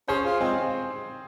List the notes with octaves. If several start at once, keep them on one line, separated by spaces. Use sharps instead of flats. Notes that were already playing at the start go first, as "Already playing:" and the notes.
C#4 G#4 C5
F4
G#3 C4